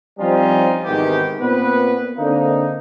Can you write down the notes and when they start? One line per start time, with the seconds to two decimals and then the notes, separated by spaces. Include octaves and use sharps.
0.19 F3 G3 C4 C#4 D#4 F4
0.84 G#2 C3 D#3 E3 B3 G4
1.41 A#2 B3 C4 B4
2.17 D3 A#3 C4 D#4